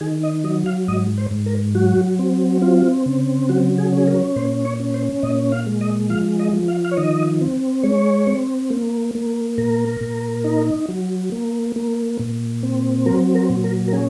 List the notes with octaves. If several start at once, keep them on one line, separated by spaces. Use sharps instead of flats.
D#3 G#4
D#5
F#3 D#5
F5
G#2 D#5
C5
G#2
A#4
F#3 F#4
C4
C4 F4
C#3
F#3 F#4
G#4
C#4 G#4
A#4
A#2 C5
C#5
C#4
C5
A#2 D#5
F5
G#3
D#5
F3 F5
D#5
F3
F5
F5
C#5
D#3 D#5
C4
G#3 C#5
C4
A#3
A#3
A#2 A#4
A#2
D#4
F#3
A#3
A#3
A#2
C4
F#3 A#4
A#4
A#2
A#4
A#4
C#4 G#4